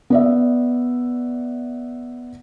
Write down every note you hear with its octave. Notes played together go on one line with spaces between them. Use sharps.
B3 D5 E5